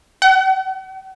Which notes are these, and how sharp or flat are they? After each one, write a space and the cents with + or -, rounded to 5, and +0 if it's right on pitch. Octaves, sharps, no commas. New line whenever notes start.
F#5 +40